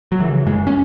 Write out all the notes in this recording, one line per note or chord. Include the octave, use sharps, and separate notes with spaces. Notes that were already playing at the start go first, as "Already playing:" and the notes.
F#3
C#3 E3
F#2 G#3
C#4